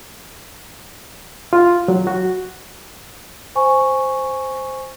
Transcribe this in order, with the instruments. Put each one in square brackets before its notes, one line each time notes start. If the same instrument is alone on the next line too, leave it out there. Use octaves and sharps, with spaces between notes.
[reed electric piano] F4
F#3
F#4
[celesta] C5 G#5 C#6